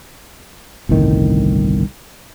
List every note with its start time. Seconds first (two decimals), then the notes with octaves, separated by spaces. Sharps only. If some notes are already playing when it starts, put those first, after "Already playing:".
0.89 G1 C2 A2 D#3